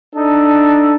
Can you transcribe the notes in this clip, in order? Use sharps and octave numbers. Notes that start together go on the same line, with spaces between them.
D4 D#4 A4